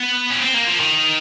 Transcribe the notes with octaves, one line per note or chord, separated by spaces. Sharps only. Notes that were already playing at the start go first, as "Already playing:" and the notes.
Already playing: B3
C#4
C4
A#3
F3
D#3